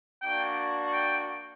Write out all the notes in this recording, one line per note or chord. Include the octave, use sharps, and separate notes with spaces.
A#3 D4 F#4 G5
G5